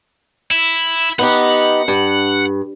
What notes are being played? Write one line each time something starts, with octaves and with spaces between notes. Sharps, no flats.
E4
B3 D#4 G4 F#5
G2